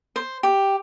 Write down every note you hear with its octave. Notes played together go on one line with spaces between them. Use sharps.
C5
G4